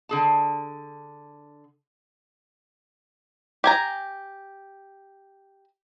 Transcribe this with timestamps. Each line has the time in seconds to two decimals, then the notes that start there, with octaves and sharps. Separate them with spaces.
0.09 D3 G#4 A5
3.64 G4 G#5 A#5